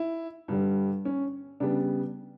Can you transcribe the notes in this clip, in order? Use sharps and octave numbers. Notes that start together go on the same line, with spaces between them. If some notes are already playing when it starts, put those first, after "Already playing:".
Already playing: E4
G2 D3 G3
C#4
C#3 G3 B3 D4